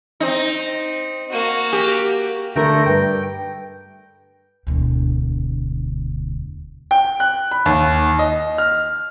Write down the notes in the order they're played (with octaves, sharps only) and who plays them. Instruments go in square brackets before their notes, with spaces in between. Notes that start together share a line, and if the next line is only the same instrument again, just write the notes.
[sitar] C4 D#4
[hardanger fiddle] A#3 F#4
[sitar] G4
[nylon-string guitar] D3 A#4 [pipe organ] A3 G5 A#6
[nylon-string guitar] G2 [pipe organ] G5
[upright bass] E1 D2
[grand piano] G5
F#6
B5
D#2
D#5
F6